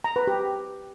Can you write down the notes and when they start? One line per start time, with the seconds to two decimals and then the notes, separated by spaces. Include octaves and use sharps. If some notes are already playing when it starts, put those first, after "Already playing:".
0.04 A#5
0.16 B4
0.27 G4